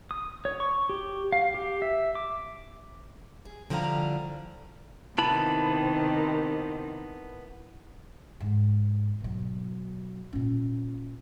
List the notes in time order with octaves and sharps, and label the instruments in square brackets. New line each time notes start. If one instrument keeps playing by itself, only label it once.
[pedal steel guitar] D#6
C#5
C#6
G4
F5
G4
E5
D6
[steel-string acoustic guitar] G#4
D3 F3 G3 E4 F5 A#5
[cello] C3 D#3 [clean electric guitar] B3 E4 B5 [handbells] A5
[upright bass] G#2
B2 F#3
A#2 C#4